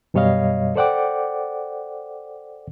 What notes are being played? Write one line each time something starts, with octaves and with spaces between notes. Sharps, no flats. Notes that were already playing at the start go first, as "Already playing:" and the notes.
F#2 B2 G3 C#5 D#5 F5
A4 C5 D5 F#5 G5 D6